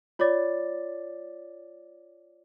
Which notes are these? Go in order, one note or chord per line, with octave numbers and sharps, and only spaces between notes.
F4 C#5 D5 D6 A6